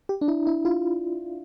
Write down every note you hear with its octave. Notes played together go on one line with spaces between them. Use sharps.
G4
D4
E4
E4
F4